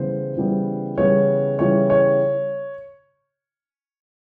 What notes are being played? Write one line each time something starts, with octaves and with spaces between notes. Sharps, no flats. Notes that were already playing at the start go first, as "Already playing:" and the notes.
Already playing: C#3 E3 G3 B3 C5
C#3 E3 G3 B3
C#3 E3 G3 B3 C#5
C#3 E3 G3 B3 C#5
C#5